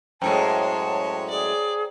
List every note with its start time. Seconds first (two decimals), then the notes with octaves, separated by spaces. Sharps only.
0.22 F#2 A2 G#3 C5 C#5 G5 A5 A#5
1.30 G#4 D5